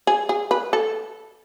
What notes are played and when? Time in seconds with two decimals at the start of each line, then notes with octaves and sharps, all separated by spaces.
0.07 G#4
0.29 G#4
0.51 B4
0.73 A4